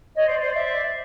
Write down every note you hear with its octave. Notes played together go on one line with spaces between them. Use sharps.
C#5 D#5
C5 D5
C5 D5
D5 E5